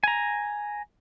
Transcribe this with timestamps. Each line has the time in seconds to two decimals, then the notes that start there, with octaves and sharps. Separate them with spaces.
0.04 G#5 A#5